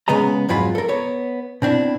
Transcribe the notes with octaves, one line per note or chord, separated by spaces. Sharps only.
C#3 G#3 B3 D#5 A#5
F2 G#2 F#3 F4 B5
A4 A#4
B3 C#5
B2 C4 D4 E4